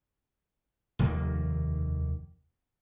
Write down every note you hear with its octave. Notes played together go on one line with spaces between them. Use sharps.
F1 D#2 D#3 A#3